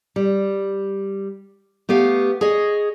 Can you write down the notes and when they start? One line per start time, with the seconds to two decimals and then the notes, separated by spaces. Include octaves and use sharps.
0.16 G3
1.89 A3 B3 G4 F5
2.41 G#4 C#5 D#5